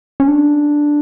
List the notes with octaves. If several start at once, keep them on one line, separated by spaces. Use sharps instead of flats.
C#4
D4